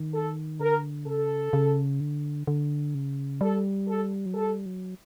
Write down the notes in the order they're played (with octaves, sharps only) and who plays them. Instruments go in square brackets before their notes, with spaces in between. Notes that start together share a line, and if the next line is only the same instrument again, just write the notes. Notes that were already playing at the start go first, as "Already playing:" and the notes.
Already playing: [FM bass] D#3
[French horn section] A4
[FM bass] D3 [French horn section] A#4
[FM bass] C#3 [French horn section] A4
[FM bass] C#3
D3
D3
C#3
[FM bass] G3 [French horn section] A4
[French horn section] A4
[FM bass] F#3
[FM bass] G3 [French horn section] A4
[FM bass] F#3